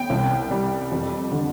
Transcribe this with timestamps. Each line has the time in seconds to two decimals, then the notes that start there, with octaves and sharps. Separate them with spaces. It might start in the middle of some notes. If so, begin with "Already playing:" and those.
Already playing: B3 G5
0.10 C2
0.51 G3
0.92 F2
1.32 D3